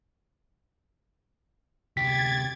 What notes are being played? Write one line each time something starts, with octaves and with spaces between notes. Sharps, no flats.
D2 C3 G4 G#6 A6 B6